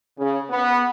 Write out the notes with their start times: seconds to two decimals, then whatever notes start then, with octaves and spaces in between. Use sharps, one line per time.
0.18 C#3
0.50 B3